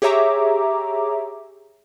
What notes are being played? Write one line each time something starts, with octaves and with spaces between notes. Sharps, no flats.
G4 G#4 C#5 E5 A#5 D6